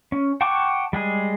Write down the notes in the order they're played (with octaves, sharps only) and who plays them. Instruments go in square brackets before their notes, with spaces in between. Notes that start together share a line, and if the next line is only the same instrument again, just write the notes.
[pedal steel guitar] C#4
F#5 G5 A5 C#6 D6
G3 G#3 G#4